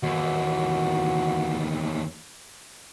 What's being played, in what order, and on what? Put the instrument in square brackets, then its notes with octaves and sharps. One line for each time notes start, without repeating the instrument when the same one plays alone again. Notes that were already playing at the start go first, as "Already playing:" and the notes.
[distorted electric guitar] D#2 E3 [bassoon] F#4